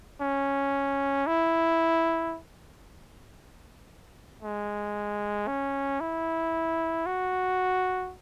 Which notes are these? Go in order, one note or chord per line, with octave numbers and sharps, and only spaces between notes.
C#4
E4
G#3
C#4
E4
F#4